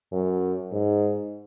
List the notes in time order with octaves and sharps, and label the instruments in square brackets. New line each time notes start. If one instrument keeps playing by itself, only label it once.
[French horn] F#2
G#2